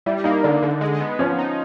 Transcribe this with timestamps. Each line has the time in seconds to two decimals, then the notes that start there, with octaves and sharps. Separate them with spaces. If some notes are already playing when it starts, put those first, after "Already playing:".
0.06 G3 E4
0.24 A#3 D#4
0.43 D3 D4
0.62 D3
0.81 G#3
1.00 B3
1.19 F3 C#4
1.38 D#4